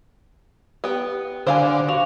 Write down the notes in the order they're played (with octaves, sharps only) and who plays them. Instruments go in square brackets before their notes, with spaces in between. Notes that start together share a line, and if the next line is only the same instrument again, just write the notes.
[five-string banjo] B3 G5 [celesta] G4
[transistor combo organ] D3 [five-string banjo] C5 F5 G#5
[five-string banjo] F#4 [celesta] F5 F7